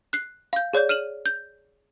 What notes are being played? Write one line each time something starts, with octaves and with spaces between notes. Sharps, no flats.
F#6 C7
F5 G6
G#4 C#5 D5 G6
F6 D#7 E7 F#7
G6